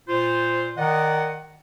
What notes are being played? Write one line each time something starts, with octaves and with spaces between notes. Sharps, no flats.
A#2 F4 C5
D#3 D5 D#5 F#5